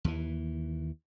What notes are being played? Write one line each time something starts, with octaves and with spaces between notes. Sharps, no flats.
D#2 E3